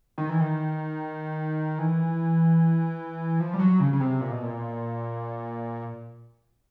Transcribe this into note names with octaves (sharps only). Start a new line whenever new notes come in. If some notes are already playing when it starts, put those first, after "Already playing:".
D#3
E3
D#3
E3
F3
G3
F#3
C#3
C#3
C3
A#2
B2
A#2